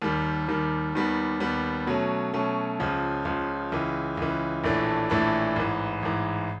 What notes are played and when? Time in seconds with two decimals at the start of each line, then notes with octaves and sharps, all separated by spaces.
0.02 D#2 D#3 G3
0.48 D#2 D#3 G3
0.95 D#2 D#3 G3 B3
1.40 D#2 D#3 G3 B3
1.87 B2 F#3 A3 C#4
2.33 B2 F#3 A3 C#4
2.80 C#2 C#3 F3
3.25 C#2 C#3 F3
3.72 C#2 C#3 E3
4.17 C#2 C#3 E3
4.64 A#1 A2 E3 A3 D4
5.10 A#1 A2 E3 A3 D4
5.56 A1 G#2 E3
6.03 A1 G#2 E3